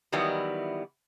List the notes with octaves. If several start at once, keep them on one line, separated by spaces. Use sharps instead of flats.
D#3 E3 F#3 G3 B3 E4